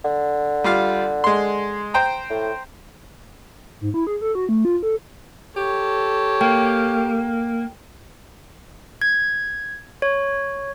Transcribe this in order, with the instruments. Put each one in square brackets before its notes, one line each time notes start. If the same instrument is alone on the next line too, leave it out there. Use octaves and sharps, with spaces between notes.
[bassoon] D3
[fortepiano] G3 F4 F5
G#3 C6
C5 G5 A#5
[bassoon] A2
[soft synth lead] G#2
E4
G#4
A4
F#4
A3
F4
A4
[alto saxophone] G4 [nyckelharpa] A4 C#5
[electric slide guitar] A#3 [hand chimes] G5
[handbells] G#6
C#5